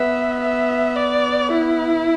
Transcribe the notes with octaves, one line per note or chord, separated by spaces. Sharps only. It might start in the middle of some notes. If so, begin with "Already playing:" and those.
Already playing: B3 E5
E5
D5
E4